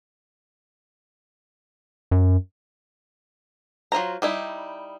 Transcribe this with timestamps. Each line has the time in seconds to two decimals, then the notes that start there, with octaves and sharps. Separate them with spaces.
2.11 F#2
3.92 F#3 F4 C5 A#5
4.22 G3 D#4 E4